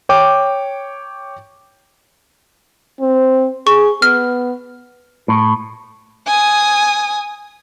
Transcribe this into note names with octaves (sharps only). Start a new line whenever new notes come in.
C#5 G5 D6
C4
G#4 C#6
B3 F6
A2
G#5 D#6